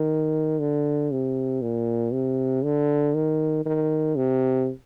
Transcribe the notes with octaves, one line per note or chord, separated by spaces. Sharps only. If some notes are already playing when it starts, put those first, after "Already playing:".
Already playing: D#3
D3
C3
A#2
C3
D3
D#3
D#3
C3